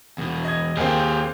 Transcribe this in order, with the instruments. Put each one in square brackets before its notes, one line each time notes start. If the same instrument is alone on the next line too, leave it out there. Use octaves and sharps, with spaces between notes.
[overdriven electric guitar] E2 B2
[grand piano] D#5 G#6
[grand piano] D#2 C4 [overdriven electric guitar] G4 G#4